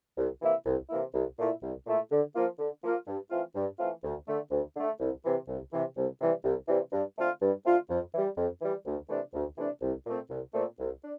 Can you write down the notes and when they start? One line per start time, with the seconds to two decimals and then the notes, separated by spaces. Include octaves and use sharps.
0.18 C2
0.42 C3 E3 A#3 E4
0.66 C2
0.89 C3 E3 A#3 E4
1.14 C2
1.39 A#2 A3 E4
1.62 C2
1.86 A#2 A3 E4
2.11 D3
2.34 F3 A#3 F4
2.59 D3
2.83 F3 A#3 F4
3.07 G2
3.31 E3 A3 C4 F4
3.56 G2
3.79 E3 A3 C4 F4
4.04 D2
4.28 D3 A3
4.51 D2
4.76 D3 A3
5.00 C2
5.25 C3 E3
5.48 C2
5.72 C3 E3
5.97 C2
6.21 C3 E3 G3
6.44 C2
6.68 C3 E3 G3
6.92 G2
7.17 D3 A3 C4 F4
7.41 G2
7.65 D3 A3 C4 F4
7.89 F2
8.14 E3 G3
8.37 F2
8.62 E3 G3
8.86 D2
9.09 C3 E3 A3 D4
9.34 D2
9.57 C3 E3 A3 D4
9.82 C2
10.06 A#2 A3 C4
10.30 C2
10.54 A#2 A3 C4
10.79 C2
11.03 D4